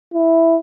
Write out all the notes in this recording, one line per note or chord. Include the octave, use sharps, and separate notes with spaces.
E4